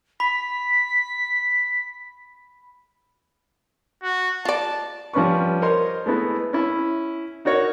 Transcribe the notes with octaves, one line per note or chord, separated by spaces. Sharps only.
B5 B6
F#4
F4 D5 A5
F3 G3 C#4 B4 C#6
A#4 C5 C#5 D#5 C6
G#3 A3 B3 E4
C#4 E4
D#4 F#4 A#4 C#5